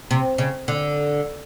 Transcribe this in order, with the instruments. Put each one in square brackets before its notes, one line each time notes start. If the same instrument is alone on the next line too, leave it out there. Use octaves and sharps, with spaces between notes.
[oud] C3
C#3
D3